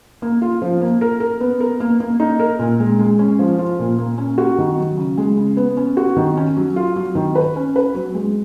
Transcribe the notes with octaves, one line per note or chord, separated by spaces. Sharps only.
A#3
F4
F3
A#3
A#4
A#4
B3
A#4
A#3
A#3
D#4
A#4
A#2
G#3
G#3
C#4
F3
F4
A#2
A#3
C#4
F#4
D#3
F#3
C#3
G#3
C#3
B3
C#4
F#4
D#3
C#4
F#3
F4
F#3
D#3
B4
C#4
B4
F#3
G#3